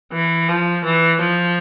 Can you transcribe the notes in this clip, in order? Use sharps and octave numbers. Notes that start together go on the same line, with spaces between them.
E3
F3
E3
F3